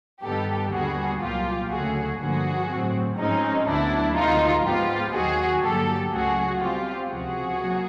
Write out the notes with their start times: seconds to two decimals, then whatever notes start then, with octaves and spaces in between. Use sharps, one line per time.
0.22 G2 D#3 G3 B3 G4 A4
0.71 D#2 D3 G3 B3 F#4 G#4
1.20 C2 A#2 F#3 A#3 F4 G4
1.70 D2 C#3 F#3 A3 F#4 G#4
2.19 G2 D3 F3 A#3 F#4 G#4
2.67 A2 F#3 A3 C4
3.16 G#2 F3 G#3 C4 C#4 D#4
3.66 D2 D3 F#3 B3 D4 E4
4.15 D2 C3 D#3 G#3 D#4 F4
4.64 G#2 F3 G#3 B3 F4 G4
5.12 D#2 D#3 F#3 F#4 G#4
5.61 G2 D3 F#3 A#3 G4 A4
6.11 C#2 C#3 F#3 A3 F#4 G#4
6.59 B2 G3 C4 F4 G4
7.09 C#2 C3 F3 F#4 G#4
7.58 F#3 A#3